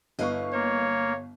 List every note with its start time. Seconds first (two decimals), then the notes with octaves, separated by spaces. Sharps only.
0.19 G1 E4 B4 D#5 F5 C#6
0.53 A#3 C#5